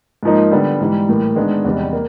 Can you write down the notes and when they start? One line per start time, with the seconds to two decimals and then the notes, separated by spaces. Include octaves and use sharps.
0.23 G#2 F3 A#3 D#4
0.51 D3 G3 B3
0.80 G#2 E3 G3
1.09 A2 E3 G3 A#3
1.36 D#3 G#3 B3 D4
1.64 E2 C3 D#3 G3
1.93 A#3